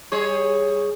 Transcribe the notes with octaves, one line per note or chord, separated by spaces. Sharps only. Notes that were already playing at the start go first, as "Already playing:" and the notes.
G3 G#4 C#5